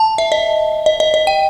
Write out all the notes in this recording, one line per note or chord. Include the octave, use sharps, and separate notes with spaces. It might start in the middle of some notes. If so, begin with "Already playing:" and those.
Already playing: A5
E5
D#5
D#5
D#5
D#5
G5